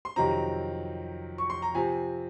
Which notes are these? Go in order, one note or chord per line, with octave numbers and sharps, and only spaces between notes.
C6
F2 C3 D#3 F#3 C4 A#5
C#6
C6
A#5
C3 F3 C4 G#5